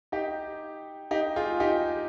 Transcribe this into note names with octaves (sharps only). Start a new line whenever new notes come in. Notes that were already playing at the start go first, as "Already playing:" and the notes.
D#4 G4
D#4 G4
F4 G#4
D#4 G4